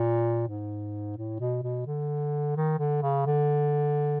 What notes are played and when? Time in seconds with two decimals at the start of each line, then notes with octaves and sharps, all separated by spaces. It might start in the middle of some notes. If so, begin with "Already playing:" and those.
Already playing: A#2
0.48 G#2
1.17 A2
1.40 B2
1.63 B2
1.87 D3
2.56 D#3
2.79 D3
3.02 C#3
3.26 D3